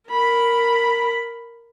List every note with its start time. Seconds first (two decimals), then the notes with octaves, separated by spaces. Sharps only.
0.10 A#4 B5